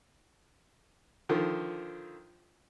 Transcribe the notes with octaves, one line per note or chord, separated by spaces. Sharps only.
D3 D#3 F3